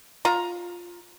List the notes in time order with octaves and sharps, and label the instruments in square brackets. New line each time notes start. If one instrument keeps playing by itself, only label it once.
[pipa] F4 A#5